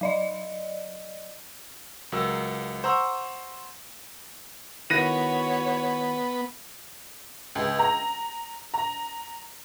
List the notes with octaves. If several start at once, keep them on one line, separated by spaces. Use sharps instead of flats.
F#3 D5 D#5
C#2 F#3 A#4 E6
C5 F#5 A#5 C#6 E6
D#3 B3 E4 F#4 C#5 F#6 A#6 D#7
C#2
A#5
A#5